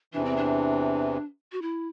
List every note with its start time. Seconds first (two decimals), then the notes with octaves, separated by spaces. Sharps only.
0.13 E2 C3 E3 D4
0.25 C4
0.37 D4
1.52 F#4
1.62 E4